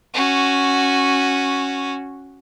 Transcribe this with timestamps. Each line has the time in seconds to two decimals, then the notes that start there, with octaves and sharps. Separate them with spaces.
0.14 C#4 F#4